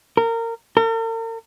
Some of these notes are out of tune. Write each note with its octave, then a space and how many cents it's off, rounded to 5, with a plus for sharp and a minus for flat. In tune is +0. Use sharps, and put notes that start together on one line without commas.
A#4 -25
A#4 -45